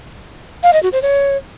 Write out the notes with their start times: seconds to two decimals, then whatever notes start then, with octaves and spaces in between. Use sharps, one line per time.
0.63 F5
0.73 D#5
0.83 F#4
0.92 C5
1.02 C#5